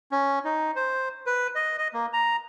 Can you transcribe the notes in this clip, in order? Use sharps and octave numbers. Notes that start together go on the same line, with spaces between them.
C#4
D#4
C5
B4
D#5
D#5
A#3
A#5